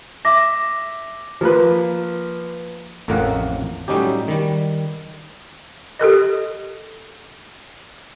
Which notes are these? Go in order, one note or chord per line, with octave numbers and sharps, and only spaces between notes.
E5 D6 A#6
F3 A#3 B4
A1 F2 A2 A#3 A#4 F#5
A2 F#3 G3 C#4 D#4 G4
D#3 G3
G4 A4 A#4 D#5